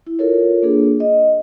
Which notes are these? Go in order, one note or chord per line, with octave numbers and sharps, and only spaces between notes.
E4
F4 A4 A#4 C#5
A#3 D4 G#4 A4
D#5